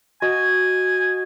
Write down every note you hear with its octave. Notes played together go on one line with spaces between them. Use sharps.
F#4 D#5 G#5